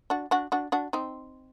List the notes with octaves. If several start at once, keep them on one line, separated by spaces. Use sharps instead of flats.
D4 F#4
D4 F#4
D4 F#4
D4 F#4
C4 D#4